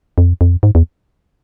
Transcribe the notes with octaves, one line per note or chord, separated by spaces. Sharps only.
F2
F2
G#2
E2